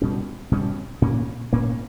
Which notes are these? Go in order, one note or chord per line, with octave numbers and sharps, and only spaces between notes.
B2 G3 C#4
B2 G3 C#4
A#2 A#3 C#4
A#2 A#3 C#4